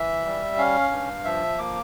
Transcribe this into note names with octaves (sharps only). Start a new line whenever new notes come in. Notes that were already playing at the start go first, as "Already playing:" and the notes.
Already playing: E3 E5
G3
C#4 F5
G2
F3 E5
A#3 D6